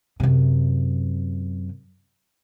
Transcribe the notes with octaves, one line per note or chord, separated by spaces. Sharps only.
F#2 C3